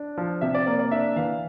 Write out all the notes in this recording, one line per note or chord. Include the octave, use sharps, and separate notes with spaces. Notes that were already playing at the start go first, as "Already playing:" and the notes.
Already playing: D4
F3
C3 E5
D5
A#3 D5
D5
D4 E5
E3 F5